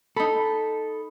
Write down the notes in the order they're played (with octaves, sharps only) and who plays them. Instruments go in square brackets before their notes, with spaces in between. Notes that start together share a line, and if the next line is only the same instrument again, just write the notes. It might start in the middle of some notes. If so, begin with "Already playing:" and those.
[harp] D#4 B5 [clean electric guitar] A4